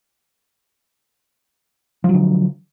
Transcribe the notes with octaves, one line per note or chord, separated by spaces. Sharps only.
D3 F3 F#3